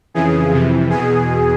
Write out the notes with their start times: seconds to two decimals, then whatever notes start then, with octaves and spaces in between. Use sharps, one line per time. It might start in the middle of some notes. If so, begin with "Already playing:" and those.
0.14 F2 C#3 E3 G#4
0.53 F2 C3 E3
0.89 E2 B2 G#4